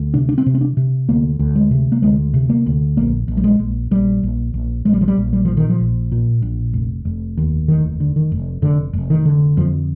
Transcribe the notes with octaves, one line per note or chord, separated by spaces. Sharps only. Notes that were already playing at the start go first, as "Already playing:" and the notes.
Already playing: D2
C3 D4
D4
C4
C3
C4
D4
C3
D2 A#3
D2
G#3
C3
A#3
D2 G#3
C3
A#3
D2
A#1 A#3
A#1
G3
G#3
A#1
A#1 G3
A#1
A#1
A#1 G#3
G3
F3
G3
A#1
G3
A#2 F3
D#3
F3
A#1
A#2
A#1
F1
F1
D#2
F1 D#3
D3
D#3
F1
F1 D3
F1
D#3
D3
F2 F3